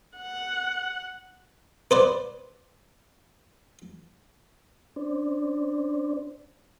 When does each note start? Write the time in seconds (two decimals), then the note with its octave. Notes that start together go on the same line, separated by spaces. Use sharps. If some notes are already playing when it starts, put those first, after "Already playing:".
0.17 F#5
1.91 B4 C5 D5
4.96 C#4 D4 C5 D5